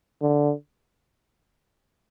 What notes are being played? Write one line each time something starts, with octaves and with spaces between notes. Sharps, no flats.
D3